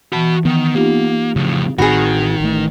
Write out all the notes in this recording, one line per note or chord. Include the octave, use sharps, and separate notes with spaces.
E3 F#4 A5 B5
D#3 B3
A#3 D#4 F4 G4
F2 A2 C#3
A1 A2 D#3 C4 F#4 G#4 B5
A1 A3